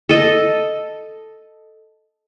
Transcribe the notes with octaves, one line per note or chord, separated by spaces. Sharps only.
A4 D#5